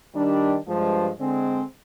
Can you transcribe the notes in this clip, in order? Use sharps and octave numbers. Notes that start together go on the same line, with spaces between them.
D#3 G3 D4
G2 F3 G#3
D3 G#3 C4